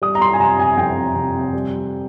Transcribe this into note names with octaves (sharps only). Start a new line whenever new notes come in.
G3 D#6
A#5
C6
G#5
C3 A#5
G#5
F2 G5
C3
G3